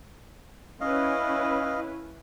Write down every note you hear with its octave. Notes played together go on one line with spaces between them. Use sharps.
C#4 E4 B4 D#5 F5